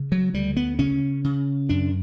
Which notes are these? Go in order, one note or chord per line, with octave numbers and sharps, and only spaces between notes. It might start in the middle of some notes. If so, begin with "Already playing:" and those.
Already playing: C#3
F#3
D2 G3
B3
C#3 C#4
C#3
F#2 D4